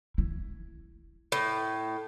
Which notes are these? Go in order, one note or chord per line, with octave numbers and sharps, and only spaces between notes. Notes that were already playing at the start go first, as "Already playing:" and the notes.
E4
A2